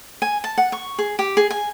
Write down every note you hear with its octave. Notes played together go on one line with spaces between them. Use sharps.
G#5
A5
F#5
C#6
G#4
G4
G#4
G#5